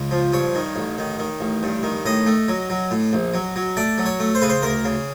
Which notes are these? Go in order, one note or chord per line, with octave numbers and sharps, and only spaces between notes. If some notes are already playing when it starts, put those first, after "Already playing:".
Already playing: C#2
F3
G2 C#5
D#3
A1
D#3
D#3
A1
G2
D#3
A2 D#5
A3
F#3
F#3
A2
A#1
F#3
F#3
A3 D5
F#3
C#5
A3
C5
C#3 B4
C5
D2 A#4
C#3